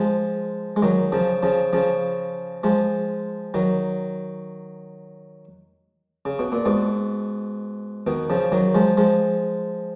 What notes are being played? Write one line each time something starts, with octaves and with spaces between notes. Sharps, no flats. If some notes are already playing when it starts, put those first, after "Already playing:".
Already playing: F3 G#3
G#3
D#3 F#3
C#3 F3
C#3 F3
C#3 F3
F3 G#3
D#3 F#3
C#3
B2
A#2
G#2 B2
B2 D#3
C#3 F3
D#3 F#3
F3 G#3
F3 G#3